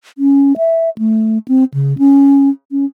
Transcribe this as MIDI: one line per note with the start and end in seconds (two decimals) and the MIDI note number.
0.18 0.53 61
0.57 0.90 76
0.98 1.38 57
1.48 1.64 60
1.74 1.97 49
1.98 2.49 61
2.71 2.85 61